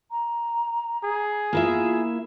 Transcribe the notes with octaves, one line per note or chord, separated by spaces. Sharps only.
A#5
G#4
A#3 E4 F4 E5